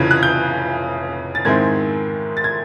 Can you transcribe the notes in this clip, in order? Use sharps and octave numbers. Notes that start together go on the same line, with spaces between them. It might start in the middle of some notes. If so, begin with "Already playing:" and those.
Already playing: F1 F2 C#3 E3 G#6
F#6
G6
A6
G#2 D#3 G#3 C4 E4 G#6
A6
G#6